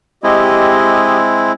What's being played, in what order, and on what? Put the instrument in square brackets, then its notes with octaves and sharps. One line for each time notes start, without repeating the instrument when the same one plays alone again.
[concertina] G#3 C4 E4 [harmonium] G4 D#5